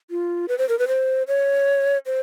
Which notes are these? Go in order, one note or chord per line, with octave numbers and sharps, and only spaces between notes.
F4
B4
C5
A#4
B4
C5
C#5
C5